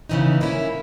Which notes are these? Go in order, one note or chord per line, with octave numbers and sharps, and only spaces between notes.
C#3 E3 B3 D#4
A#2 A#3 C#4 E4